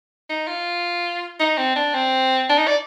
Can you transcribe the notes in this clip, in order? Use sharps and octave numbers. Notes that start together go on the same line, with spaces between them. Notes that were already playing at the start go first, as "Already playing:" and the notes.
D#4
F4
D#4
C4
D4
C4
D4
D#4
D5